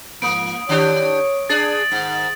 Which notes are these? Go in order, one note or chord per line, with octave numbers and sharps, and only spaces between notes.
G#2 F3 A#3 D#6 D7
D#3 D4 G4 C#5
D4 G#4 A6 F#7
G#2 D#3 F#5